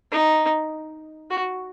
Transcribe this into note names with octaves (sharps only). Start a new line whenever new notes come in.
D#4
F#4